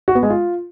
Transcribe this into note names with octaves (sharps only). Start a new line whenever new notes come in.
F#4
B3
G#3
F4